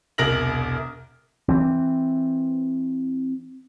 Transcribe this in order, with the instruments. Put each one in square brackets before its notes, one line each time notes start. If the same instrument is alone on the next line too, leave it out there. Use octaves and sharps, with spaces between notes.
[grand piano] E1 C2 A#4 F6 A#6 F#7
[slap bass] E3 C4